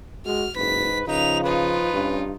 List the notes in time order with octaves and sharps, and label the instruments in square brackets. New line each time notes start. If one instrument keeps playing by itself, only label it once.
[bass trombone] G#3 [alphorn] F#4 [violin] F6
[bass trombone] F#1 [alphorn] G#2 [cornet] B4 [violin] B6
[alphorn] C#3 [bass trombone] F3 [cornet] D#4 [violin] B4 F7
[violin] D#4 F4 [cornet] B4
[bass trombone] G2 [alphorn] C#4